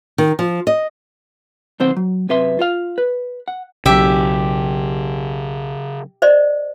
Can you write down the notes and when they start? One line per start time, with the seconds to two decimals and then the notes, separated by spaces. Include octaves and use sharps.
0.18 D#3
0.39 F3
0.67 D#5
1.80 B1 D#3 C4 C5 F#5
1.96 F#3
2.29 F#2 C3 B4 E5 C6
2.59 F4 F5
2.98 B4
3.48 F#5
3.86 B1 C#3 F#3 G4 E5
6.22 C5 D5 D#5